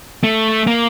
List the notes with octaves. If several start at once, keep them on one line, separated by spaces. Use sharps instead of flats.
A3
A#3